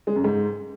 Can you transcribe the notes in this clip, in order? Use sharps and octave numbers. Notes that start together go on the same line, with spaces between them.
G#3
F#2
G#2